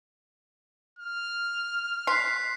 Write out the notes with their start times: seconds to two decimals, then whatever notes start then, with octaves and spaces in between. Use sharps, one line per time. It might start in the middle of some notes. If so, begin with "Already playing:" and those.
0.99 F6
2.07 C6 F#6 B6 C7